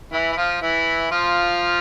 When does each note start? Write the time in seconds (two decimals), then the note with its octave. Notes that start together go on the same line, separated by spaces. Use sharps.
0.12 E3 E4
0.32 E4
0.37 F3 F4
0.62 E3 E4
1.12 F3 F4